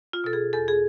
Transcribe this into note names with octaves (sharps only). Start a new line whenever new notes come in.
F4
B2 A4
G#4
E2 A4
G#4